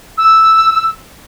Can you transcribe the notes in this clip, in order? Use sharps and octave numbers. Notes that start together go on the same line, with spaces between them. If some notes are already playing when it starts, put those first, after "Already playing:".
E6